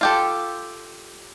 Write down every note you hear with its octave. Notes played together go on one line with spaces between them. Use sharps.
F4 G4 A4